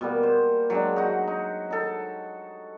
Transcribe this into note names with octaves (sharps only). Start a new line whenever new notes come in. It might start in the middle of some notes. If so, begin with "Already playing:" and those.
B2 G3 A#3
C5
F#3 G#3 D4
D#4 F#4
D#4
D#4 A4